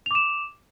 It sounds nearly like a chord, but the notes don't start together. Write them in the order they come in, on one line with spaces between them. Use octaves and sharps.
F7 D6 E7